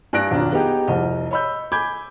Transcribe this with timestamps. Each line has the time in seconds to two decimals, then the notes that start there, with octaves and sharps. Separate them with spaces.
0.13 G2 D5 G#5 F#6 A#6 D7
0.30 D#1 B1 F2 D4 A#5
0.52 B3 D#4 G4 G#4
0.88 F1 C2 D#5
1.31 C#5 D#5 B5 E6 G6
1.72 G#5 B5 D6 G6 G#6